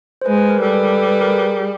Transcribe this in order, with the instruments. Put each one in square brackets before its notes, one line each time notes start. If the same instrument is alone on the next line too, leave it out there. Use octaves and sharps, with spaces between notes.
[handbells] C5
[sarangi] G#3 [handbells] B4
[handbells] B4
A#4
[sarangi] G3 [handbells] A4
[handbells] B4
A4
A4
B4
A#4
G#4